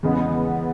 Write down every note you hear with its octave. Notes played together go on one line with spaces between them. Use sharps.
E2 C#3 G#3 B3